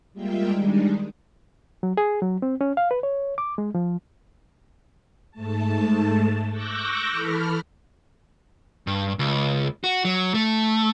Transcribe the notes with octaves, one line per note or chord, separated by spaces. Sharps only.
G3 G#3 A#3 F4 E5 G5
D#3 G3 G#3 D4 D#4
F#3
G#4
F#3
C4
C#4
F5
B4
C#5
D6
G#3
F3
G#2 A3 A5
C#6 D6 E6 F#6 G6 A#6
E3 A4 B5 F6
G2
C#2
F#4
F#3
A3